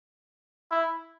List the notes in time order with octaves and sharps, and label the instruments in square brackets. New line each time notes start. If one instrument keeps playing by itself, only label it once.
[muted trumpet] E4